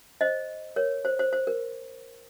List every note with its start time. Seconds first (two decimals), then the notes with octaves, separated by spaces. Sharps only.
0.21 C5 D#5
0.76 A#4 C#5
1.05 C5
1.19 C5
1.33 C5
1.47 A#4